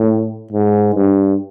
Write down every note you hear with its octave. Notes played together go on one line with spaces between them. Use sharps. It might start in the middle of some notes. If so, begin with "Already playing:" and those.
Already playing: A2
G#2
G2